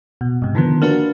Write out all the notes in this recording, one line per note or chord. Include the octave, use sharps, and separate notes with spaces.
B2
G#2 C3
D3 D#3 F3 B3
A#3 D4 F#4 B4